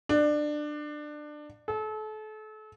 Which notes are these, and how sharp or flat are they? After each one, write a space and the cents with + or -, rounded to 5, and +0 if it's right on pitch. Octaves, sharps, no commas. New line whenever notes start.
D4 +20
A4 -35